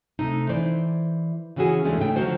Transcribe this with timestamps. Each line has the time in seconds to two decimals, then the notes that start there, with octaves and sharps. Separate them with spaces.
0.19 C3 A3 D#4
0.49 E3 C5 D5
1.56 C#3 E3 C#4 F#4 G#4
1.84 D#2 E3 G#3 A3 C#4 D4
1.98 A2 C#3 A3 D#4 G5
2.16 D3 D#3 F3 F#3 F#4 C5